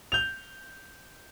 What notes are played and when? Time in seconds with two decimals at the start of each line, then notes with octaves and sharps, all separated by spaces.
0.12 G6 F7